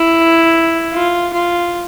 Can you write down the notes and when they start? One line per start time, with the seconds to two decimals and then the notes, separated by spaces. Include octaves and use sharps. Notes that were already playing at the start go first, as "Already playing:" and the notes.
Already playing: E4
0.93 F4
1.33 F4